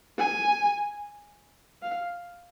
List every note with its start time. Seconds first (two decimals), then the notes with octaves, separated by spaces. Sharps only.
0.18 G#5
1.83 F5